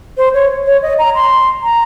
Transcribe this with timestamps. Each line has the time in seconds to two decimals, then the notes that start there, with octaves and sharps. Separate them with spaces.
0.17 C5
0.34 C#5
0.66 C#5
0.82 D#5
0.99 A#5
1.15 C6
1.63 A#5